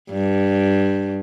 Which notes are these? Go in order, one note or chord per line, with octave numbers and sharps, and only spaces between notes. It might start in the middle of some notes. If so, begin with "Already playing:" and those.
G2